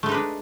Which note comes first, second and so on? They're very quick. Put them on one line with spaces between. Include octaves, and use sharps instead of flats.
A3 G#3 D#4 B4 D4